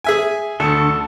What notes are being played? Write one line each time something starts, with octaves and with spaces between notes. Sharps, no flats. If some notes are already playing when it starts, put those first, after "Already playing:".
G#4 E5 G#5
D2 D3 A4 A5 C#6